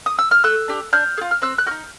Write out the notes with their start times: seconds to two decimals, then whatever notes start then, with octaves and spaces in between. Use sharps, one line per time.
0.06 D#6
0.19 E6
0.31 F6
0.44 A3 E6 F#6
0.68 D4 G4
0.93 D4 F6 G6
1.18 G#4
1.21 F4
1.31 F6
1.42 C4 E6 F#6
1.58 F#6
1.66 D#4 F#4 F6 G6